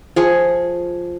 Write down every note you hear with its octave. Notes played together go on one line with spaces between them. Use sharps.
F3 G#4 C#6